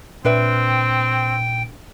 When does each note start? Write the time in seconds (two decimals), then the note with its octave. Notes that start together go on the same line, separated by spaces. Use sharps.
0.25 A#2 C4 D4 B4 E5 G5